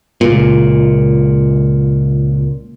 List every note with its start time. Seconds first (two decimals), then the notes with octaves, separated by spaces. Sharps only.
0.21 C#2 A#2